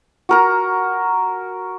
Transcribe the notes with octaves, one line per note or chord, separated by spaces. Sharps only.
F#4 A#4 A#5